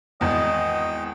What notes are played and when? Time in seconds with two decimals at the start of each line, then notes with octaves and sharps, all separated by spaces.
0.21 G#1 E2 D#5 G5